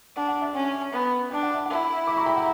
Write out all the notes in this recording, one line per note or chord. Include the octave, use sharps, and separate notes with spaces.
D4 F#5
F#5
E5
C#4
B3
D4 G5
F#5
E5
E4 F#5
B5 D6
A#5 C#6
G5 B5
F#5 A#5